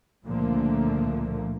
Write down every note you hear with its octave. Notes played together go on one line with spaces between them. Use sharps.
C#2 A#2 D3 F3 A3 A#3